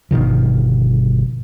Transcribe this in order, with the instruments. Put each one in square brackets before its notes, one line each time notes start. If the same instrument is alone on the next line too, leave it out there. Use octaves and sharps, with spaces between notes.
[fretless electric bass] G1 B2 D#3 F3